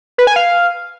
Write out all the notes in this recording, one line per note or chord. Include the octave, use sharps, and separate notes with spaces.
B4
G#5
F5